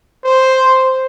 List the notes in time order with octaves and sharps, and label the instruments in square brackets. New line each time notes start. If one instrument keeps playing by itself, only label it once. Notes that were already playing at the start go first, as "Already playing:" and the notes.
[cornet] C5